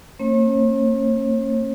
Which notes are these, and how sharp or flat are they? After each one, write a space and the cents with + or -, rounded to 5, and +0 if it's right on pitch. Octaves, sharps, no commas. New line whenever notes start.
A#3 -40 C#4 -45 C#5 -45